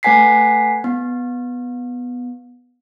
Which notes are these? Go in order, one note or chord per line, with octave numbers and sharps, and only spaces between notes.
A3 B4 F#5 G#5 B6 C7
B3